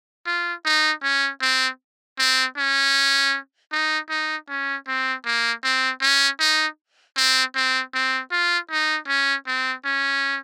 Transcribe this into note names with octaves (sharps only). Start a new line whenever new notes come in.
F4
D#4
C#4
C4
C4
C#4
D#4
D#4
C#4
C4
A#3
C4
C#4
D#4
C4
C4
C4
F4
D#4
C#4
C4
C#4